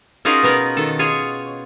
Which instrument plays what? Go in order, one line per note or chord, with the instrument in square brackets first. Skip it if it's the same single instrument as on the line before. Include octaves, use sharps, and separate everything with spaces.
[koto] C#4 D#4 F4 F#4 G#4 A#4
B2 B3 A#4
D#3 A4
F4 G#4 C#5